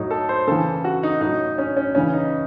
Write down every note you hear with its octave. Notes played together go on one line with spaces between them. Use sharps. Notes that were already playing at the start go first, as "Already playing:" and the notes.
Already playing: A2 F#3 D#4
A4
C5
C#3 E3 A4
F#4
D#4
A2 F#3 D#4
C#4
C#4
C#3 E3 C#4
D#4